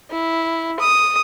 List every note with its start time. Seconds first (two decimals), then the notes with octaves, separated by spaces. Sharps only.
0.11 E4
0.80 D#6